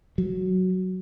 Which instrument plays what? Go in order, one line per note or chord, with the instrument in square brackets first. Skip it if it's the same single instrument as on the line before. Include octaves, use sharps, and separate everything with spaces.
[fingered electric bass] F#3